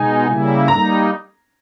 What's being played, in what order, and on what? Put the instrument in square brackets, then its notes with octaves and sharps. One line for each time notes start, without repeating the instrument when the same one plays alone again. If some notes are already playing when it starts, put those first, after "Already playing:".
Already playing: [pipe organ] B2 G#3 D#4 [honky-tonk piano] G#5
[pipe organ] C#3 G3 A#3 E4
[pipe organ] G3 A#3 D#4 [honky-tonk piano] A#5